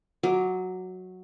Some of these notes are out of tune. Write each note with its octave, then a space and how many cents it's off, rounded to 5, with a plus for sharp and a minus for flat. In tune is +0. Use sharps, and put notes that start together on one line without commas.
F#3 -5 D#5 +35 D6 +0